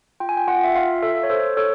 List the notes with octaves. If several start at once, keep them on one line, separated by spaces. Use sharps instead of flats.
F4 G5
G#5
G5
F4 F#5
E5
F4 F5
A4 E5
C#5
A4 C5
A4 C#5